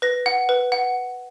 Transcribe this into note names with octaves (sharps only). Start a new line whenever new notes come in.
B4 A#6
F#5
B4
F#5